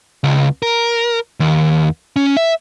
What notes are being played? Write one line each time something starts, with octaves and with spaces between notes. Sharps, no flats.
C#2
A#4
D#2
C#4
E5